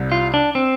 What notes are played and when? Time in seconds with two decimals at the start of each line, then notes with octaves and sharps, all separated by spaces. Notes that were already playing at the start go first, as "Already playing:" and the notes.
Already playing: C2 C3 G3
0.12 F4
0.34 D4
0.55 C4